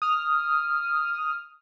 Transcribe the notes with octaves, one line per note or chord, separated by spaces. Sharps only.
D#6 F6